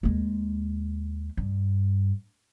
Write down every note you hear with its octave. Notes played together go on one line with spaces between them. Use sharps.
D#2 G#3
G2